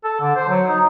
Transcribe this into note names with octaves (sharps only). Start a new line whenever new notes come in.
A4
D3
C5
F#3
D#4